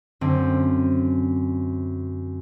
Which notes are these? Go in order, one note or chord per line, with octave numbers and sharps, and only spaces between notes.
F#2 D3 C4